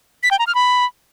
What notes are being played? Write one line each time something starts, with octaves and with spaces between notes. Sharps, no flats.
B6
G5
A#5
F6
B5